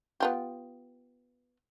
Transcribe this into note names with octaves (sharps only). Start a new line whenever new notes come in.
B3 F4 G4